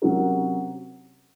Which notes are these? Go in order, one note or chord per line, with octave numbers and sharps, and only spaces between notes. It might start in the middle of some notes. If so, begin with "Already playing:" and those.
C3 F#3 C#4 F#4 A#4